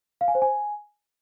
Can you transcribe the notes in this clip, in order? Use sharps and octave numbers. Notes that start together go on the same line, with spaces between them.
F5
G#5
C5
G#5